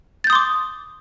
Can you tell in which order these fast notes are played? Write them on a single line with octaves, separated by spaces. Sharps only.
A6 G6 D#6 C6 D6